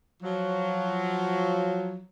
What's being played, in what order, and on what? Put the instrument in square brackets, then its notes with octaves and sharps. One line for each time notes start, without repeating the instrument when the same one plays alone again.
[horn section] F3 F#3